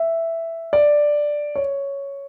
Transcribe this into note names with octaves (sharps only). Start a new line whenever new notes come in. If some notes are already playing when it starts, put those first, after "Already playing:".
Already playing: E5
D5
C#5